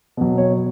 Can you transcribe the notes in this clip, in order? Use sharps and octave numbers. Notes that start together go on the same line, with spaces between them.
B2 F#3
C#5